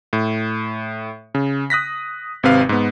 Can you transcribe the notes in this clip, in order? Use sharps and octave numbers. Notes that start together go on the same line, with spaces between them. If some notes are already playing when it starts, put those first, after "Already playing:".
A2
C#3
D#6 F#6 A#6 B6
G#1 C3 C4 B4 F5
G#2 B3